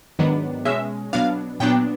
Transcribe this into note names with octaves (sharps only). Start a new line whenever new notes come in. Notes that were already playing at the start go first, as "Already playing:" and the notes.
G#2 D#3 F#3 B3 D4
B2 G#3 C#4 E5
B2 F#3 B3 D4 F5
A#2 F#3 B3 D4 G5